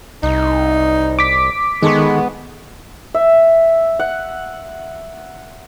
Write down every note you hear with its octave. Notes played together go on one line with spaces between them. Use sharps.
C2 D#4
D6 B6
D#3 G#3 B3 A4 C#6
E5
F#5